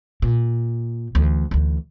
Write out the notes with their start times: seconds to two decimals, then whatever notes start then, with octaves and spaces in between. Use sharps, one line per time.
0.22 A#2
1.15 D2 E3
1.51 D2 E3